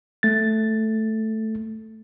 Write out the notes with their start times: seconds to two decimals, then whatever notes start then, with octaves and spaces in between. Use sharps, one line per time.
0.23 A3 A6